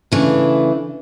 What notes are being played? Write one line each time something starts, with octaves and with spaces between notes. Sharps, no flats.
C#3 E3 A3 D4